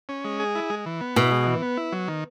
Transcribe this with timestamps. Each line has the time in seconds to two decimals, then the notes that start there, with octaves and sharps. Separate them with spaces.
0.09 C#4
0.25 G#3
0.40 G#4
0.55 E4
0.70 G#3
0.86 E3
1.01 B3
1.16 B2 E4
1.31 G#3
1.47 E3
1.62 B3
1.77 E4
1.92 F#3
2.08 D#3